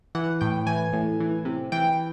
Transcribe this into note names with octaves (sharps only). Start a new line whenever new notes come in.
E3 F#5
A2 G5
E3 G#5
A2
E3
C3
E3 G5